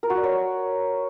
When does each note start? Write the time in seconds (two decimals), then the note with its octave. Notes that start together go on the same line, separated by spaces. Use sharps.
0.03 A#4
0.10 F#4
0.17 D5
0.24 C#5